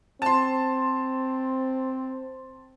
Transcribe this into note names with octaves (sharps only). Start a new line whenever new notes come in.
C4 A5 C6